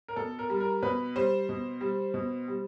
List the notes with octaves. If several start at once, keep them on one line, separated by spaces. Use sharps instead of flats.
A#4
B2 A4
A#4
G3
A#4
B2 B4
G3 C5
B2
G3
B2
G3